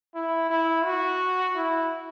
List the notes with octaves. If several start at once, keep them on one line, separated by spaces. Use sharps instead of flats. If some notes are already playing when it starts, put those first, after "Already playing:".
E4
E4
F#4
E4